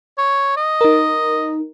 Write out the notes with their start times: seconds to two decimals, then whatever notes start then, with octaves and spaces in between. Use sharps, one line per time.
0.18 C#5
0.57 D#5
0.81 D#4 A#4